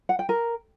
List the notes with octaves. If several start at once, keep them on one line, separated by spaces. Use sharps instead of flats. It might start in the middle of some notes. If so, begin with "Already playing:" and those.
F#5
G5
A#4